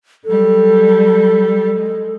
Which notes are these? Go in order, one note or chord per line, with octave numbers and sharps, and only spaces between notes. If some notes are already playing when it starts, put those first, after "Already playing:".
F#3 G3 A4
G#3